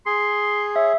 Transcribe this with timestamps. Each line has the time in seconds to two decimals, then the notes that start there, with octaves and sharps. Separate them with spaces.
0.06 G#4 C6
0.76 C#5 E5